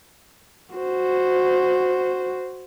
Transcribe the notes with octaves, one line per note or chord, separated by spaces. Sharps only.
F#4 C5